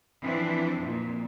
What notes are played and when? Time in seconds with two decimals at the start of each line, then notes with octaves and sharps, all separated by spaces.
0.24 E3 F3 C4 D4 E4
0.80 F2 A#2